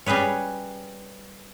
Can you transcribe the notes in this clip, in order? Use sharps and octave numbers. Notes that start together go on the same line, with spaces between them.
G3 C#4 G#4 B4 C#5